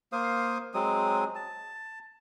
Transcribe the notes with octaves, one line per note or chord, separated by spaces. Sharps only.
A#3 C5 F5 D#6
F#3 G#3 C4 D#6
A5